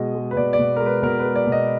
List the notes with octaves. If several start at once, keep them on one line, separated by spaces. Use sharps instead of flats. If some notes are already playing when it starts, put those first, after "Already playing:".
Already playing: B2 G#3 D#5
G#3
B4
B2 D5
D5
B2
G#3 A#4
B4
B2 A#4
B4
G#3
D5
B2
D#5